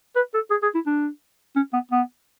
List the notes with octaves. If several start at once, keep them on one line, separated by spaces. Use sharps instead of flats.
B4
A4
G#4
G#4
E4
D4
C#4
B3
B3